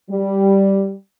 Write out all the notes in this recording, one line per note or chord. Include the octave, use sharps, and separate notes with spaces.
G3